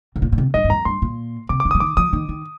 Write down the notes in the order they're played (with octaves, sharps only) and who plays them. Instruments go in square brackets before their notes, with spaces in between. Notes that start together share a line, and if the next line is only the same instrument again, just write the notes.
[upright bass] C3
A#2
A#2
C3
[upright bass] G2 [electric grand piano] D#5
[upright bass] G2
[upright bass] F2 [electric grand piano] A#5
[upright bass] G2 [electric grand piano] C6
[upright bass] A#2
[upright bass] C3 [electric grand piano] D6
[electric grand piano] D6
[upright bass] D3
[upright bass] F3 [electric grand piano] D#6
[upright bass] D#3 [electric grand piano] D6
[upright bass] F3 [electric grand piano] D#6
[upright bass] D#3
D#3